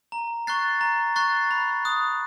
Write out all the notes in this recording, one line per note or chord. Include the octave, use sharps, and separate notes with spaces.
A#5
C#6 F#6 A6 C7
A#5
C#6 F#6 A6 C7
B5
D#6 F#6